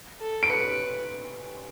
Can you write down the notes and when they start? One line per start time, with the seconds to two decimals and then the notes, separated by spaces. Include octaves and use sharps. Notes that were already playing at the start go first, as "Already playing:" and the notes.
0.21 A4
0.43 D7
0.49 B4 C#7